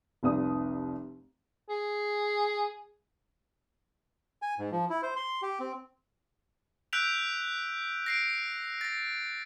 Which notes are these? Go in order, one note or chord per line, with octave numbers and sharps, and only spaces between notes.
F1 C2 D5 D#6
G#4
G#5
G#2
F3
E4
C5
C6
G4
C4
E6 F#6 G6 B6 D7 F7
A#6 C7 D7
A6 A#6